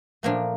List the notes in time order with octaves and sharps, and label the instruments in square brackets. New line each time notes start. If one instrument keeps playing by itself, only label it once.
[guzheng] A#2 F3 A3 A#3 D4